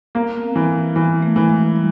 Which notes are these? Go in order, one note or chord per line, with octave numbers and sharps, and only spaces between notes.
A#3 B3
C4
E3
E3 B3
A3
E3
G#3
G3